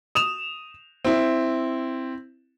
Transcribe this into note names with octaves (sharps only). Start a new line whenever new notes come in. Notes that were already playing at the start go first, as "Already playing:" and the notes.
D#6 E7 F7
C4 E4